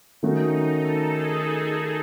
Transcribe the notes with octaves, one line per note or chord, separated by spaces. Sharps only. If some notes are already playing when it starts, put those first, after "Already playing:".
D#3 A3 C#4 D#4 F#4
A4
G#4